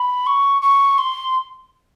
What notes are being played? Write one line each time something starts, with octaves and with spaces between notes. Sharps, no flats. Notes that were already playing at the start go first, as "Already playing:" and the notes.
Already playing: B5
C#6
C#6
C6